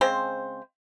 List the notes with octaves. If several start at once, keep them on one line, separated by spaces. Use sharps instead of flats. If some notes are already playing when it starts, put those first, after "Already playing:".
C#3 G#3 C4 C5